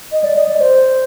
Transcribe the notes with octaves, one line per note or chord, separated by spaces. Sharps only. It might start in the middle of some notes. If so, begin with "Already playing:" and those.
D#5
D5
D#5
D5
C5